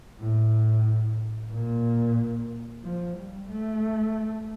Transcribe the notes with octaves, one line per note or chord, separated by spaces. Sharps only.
A2
A#2
F3
G3
A3